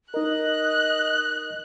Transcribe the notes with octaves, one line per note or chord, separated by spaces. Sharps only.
D#4 A#4 D#5 F#6